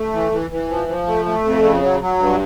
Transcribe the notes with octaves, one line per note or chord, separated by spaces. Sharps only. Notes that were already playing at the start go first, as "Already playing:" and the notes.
Already playing: A3
E3
E3
E3
F3
F3
A3
A3
F2
C#3
F#3
F#3
G2